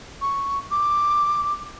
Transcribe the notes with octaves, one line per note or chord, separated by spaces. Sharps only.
C#6
D6